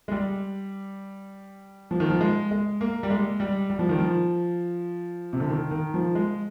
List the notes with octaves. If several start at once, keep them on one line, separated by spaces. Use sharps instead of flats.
G#3
G3
F3
D#3
F3
G#3
G#3
A#3
G3
G#3
G3
G3
F3
D#3
F3
C3
D3
D#3
D#3
F3
G#3